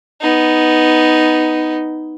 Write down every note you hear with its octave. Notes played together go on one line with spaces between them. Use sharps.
B3 D#4